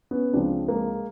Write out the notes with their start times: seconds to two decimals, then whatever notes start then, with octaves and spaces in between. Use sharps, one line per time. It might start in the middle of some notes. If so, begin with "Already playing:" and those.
0.11 B3 C#4
0.33 C#2 C3 F3 C4 D4
0.68 G#3 A#3